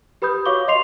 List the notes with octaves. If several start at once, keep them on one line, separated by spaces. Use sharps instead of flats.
G4 B4 B5 D#6 G6
F#4 C#5 F5 C#6 D6 G7
D#5 C6 C7 F7